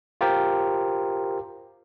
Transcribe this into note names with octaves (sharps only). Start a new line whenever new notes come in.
F4 G4 A#4 C5